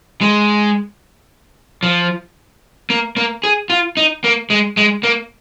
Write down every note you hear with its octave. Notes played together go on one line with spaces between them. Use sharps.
G#3
F3
A#3
A#3
G#4
F4
D#4
A#3
G#3
G#3
A#3